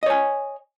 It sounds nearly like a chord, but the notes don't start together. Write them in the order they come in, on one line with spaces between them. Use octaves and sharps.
D#5 C#5 G#5